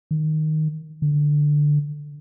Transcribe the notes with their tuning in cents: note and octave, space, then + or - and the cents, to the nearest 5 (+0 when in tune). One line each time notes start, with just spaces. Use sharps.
D#3 -5
D3 +5